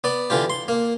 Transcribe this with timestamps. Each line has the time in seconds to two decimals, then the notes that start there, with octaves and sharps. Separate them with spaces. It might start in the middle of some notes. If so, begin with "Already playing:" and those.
0.04 B3 D5
0.30 D3 E3 F4 G4
0.50 C6
0.68 A#3